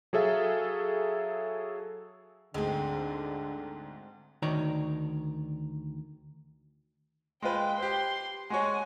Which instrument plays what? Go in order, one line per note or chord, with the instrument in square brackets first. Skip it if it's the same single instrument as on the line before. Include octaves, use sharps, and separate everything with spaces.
[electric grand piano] F#3 G#4 A4 E5 F5
[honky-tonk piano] D2 G#2 [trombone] D3 [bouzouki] G#3 C4
[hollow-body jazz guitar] D2 D#3 C#5 D5 A#5
[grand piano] G#3 F4 B4 [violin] G5
[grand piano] G4 C5 [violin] C6
[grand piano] G#3 F#4 C#5 [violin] F#5 G#5